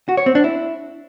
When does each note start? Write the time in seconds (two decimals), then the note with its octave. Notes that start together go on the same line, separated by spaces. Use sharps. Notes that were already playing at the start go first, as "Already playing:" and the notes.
0.09 F#4
0.17 C#5
0.26 C4
0.35 D4
0.44 E4